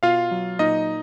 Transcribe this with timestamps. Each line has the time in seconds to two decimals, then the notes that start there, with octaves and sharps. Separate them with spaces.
0.03 B2 F4 F5
0.31 F#3
0.59 A#2 D#4 D#5